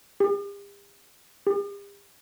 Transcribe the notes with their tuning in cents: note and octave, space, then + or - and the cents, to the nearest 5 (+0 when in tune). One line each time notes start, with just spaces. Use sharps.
G4 +45
G4 +45